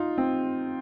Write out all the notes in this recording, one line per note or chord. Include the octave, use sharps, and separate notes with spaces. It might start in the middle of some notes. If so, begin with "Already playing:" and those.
Already playing: D#4 F4
C4